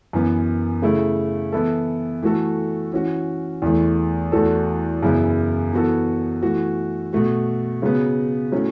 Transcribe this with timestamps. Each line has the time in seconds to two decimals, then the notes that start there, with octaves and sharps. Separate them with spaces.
0.13 F#2 E3 B3
0.82 C#3 A3 E4
1.52 E3 B3 E4 A4
2.23 E3 A3 F#4 A4
2.92 E3 C#4 F#4
3.62 E2 E3 A3
4.32 E2 E3 A3 F#4 A4
5.03 F#2 C#3 E3 B3 E4
5.73 E3 B3 F#4 A4
6.42 E3 A3 F#4
7.13 B2 A3 F#4
7.82 C#3 F#3 B3
8.52 A2 F#3 A3 C#4